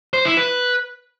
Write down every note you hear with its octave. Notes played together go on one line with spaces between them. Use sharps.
C5
E4
B4